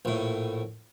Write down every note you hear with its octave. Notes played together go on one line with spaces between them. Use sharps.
A#1 A2